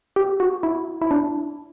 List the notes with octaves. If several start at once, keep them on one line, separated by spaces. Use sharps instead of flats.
G4
F#4
E4
E4
D4